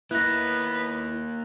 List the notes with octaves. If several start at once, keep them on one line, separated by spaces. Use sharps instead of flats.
A#3 B3 D#4 E4 F#6 A#6